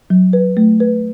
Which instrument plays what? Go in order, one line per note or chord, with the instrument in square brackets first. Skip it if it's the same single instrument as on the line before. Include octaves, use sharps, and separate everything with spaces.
[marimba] F#3
B4
A3
B4